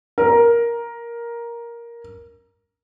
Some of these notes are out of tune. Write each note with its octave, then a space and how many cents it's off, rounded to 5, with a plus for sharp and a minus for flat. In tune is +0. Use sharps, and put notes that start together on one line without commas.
A#4 +10